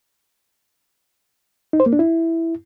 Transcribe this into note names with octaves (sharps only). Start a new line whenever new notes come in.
D#4
C5
A#3
D4
E4